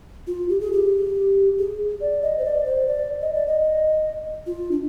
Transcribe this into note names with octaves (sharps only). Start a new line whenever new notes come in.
F4
G4
G#4
G4
G#4
D5
D#5
C5
D5
C5
D5
D#5
D5
D#5
F4
D4